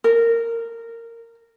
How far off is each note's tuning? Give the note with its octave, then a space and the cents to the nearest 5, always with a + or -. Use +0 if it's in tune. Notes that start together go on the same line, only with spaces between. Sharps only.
A#4 -15